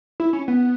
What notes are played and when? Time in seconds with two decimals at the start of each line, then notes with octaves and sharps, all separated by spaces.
0.20 E4
0.33 C#4
0.48 B3